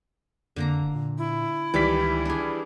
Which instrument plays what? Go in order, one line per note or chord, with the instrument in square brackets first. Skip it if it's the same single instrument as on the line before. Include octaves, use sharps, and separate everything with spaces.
[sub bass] F2 [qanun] D3 A#3 A#5
[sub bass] F#1
A#2
[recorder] E4
[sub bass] C#2 [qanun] D#3 G4 D5 [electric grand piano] E3 G3 B6
[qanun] D4 G#4